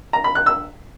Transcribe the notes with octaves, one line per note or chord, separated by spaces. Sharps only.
A#5
B5
F#6
E6